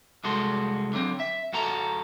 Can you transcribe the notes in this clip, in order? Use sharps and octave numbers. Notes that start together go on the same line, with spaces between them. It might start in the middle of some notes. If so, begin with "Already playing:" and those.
C2 F2 G#3 F#4 A4 C6
D3 F#3 C4
E5
F2 F#4 A4 A#5